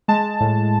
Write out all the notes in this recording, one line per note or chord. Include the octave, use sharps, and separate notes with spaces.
G#3 A5
A2